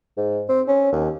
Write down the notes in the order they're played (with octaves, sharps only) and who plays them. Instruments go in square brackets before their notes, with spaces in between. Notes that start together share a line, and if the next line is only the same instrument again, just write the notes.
[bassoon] G#2
C4
C#4
D#2